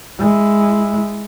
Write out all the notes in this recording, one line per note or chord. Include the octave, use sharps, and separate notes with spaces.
G#3 E4